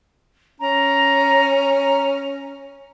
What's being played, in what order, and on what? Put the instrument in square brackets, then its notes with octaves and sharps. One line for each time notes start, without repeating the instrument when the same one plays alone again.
[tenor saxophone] C#4 [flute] A#5